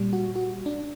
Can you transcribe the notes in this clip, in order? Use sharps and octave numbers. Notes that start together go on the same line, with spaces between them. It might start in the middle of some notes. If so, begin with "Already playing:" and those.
Already playing: A#2 G3
F#4
F#4
D4